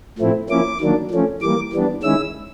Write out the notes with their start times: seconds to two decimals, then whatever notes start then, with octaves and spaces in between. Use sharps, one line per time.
0.18 A2 F3 A3 C4 E4
0.49 F3 A#3 C#4 E4 D6
0.80 D#3 F#3 A#3 D4
1.11 F3 A3 C#4
1.41 E3 G3 A#3 D6
1.72 E3 G3 B3 D4
2.02 D#3 G#3 C#4 E4 E6